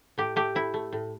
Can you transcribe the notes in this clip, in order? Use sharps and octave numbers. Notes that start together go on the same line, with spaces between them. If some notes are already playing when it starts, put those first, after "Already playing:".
A2 G4
A3 G4
A2 E4
A3
A2